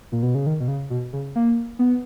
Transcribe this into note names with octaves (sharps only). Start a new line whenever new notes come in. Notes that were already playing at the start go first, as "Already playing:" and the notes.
A#2
B2
C#3
D#3
B2
C#3
B2
C#3
A#3
B3